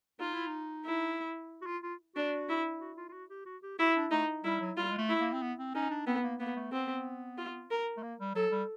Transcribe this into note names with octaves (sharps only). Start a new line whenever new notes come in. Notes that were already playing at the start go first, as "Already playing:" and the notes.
D#4 F4
E4
D#4
E4
F#4
F4
F4
D4 F#4
E4
F#4
F4
F4
F#4
G4
F#4
G4
E4 F#4
D4
A3 D#4
G3 E4
F#3
G3 F4
G#3
A3
E4
A#3
C4
B3
C4
C#4 D#4
D4
B3 C4
A#3
A#3 B3
A3
B3 C4
F4
A#4
A3
A#3
G3
F#3 A4
G3